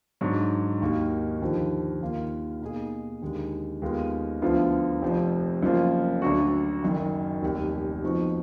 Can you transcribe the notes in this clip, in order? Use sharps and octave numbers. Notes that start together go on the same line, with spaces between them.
G#2 F#3 D4
D#2 D#3 A#3 D#4 F#4
D#2 D3 F3
D#2 D#3 A#3 F4
B2 A#3 D#4 G#4
D#2 D3 G#3
D#2 D#3 G#3 B3 F4
D2 D3 F3 B3 F4
F1 F2 F3
F#1 F#2 F3 A#3 F4
D2 D3 F#3 D4 F#4
F#1 F#2 D#3
F1 D#2 D#3
F2 F3 B3 D#4 F#4